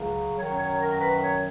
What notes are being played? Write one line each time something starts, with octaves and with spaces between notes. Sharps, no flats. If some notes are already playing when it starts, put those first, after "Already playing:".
Already playing: C#2 C#3 F#3
F#2 D#3 F#3 C#5
C#5
A#4
B4
C#5